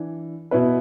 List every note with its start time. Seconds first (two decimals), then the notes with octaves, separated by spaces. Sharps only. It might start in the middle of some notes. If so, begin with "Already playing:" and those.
Already playing: E3 D4
0.51 B2 B3 E4 B4